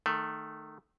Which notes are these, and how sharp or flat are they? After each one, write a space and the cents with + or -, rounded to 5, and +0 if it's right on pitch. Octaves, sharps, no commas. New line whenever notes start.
D#3 -20 A3 -5